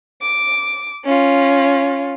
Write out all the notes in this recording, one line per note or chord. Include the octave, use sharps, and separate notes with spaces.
D6
C#4 F4